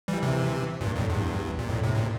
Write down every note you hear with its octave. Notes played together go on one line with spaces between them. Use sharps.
E3 G3
C3 E3
G2 A#2
F2 A2
E2 G2
A#2
F2 A2
A2 C3
A2
A#2